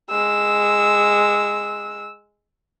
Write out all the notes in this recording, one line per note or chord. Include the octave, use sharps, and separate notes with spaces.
G#3 E6